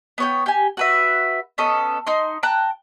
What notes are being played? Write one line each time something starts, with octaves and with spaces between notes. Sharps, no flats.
B3 C#5 G5
G4 G#5
F#4 B4 E5
B3 C#4 A4 D#5
D#4 C6
G5 A5 A#5 F#6